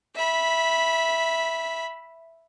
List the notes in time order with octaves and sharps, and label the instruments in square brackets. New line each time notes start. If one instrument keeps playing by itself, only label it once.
[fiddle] E5 B5